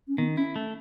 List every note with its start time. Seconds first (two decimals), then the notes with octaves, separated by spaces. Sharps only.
0.08 C#4
0.18 D#3 B3
0.37 C#4 E4
0.56 A3